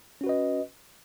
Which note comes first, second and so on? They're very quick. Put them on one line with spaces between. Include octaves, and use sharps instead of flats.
C#4 F#4 B4 D#5